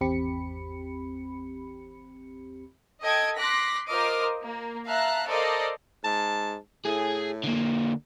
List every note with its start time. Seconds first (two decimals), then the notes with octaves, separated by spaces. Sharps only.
0.01 G#1 E2 C4 G4 B5 C#7
3.02 A4 D#5 G5 G#6 D7
3.37 C6 D6 F#6 A#6 B6
3.88 F4 A#4 C5 D#5 D6 F6
4.42 A#3
4.85 E5 F5 A5 A#5 F#6
5.26 A4 A#4 C5 D5 D#5 F5
6.05 G#2 A5
6.85 A2 G#4 G#5
7.44 D3 A#3